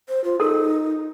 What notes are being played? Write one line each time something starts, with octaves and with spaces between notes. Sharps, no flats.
C5
F4
D#4 A4 A#4